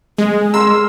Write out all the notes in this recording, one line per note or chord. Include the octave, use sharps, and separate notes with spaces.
G#3 G#4
A#4 C6 E6